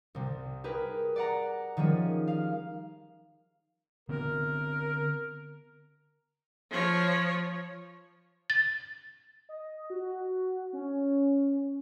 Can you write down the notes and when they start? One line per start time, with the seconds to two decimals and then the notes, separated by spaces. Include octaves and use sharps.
0.15 C2 C3
0.64 G4 G#4 A#4 B4
1.16 D5 F#5 A#5
1.77 D#3 F3 G3 C#4 G#4
2.27 F5
4.09 D3 B3 C4 A#4
6.71 F3 C#5
8.50 A6
9.49 D#5
9.90 F#4
10.73 C#4